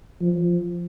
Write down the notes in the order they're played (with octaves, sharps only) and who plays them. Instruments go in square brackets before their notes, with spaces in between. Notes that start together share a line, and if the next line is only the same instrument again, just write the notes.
[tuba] F3